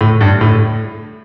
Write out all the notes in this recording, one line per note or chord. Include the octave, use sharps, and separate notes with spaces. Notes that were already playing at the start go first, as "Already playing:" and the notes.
A2
G2
A2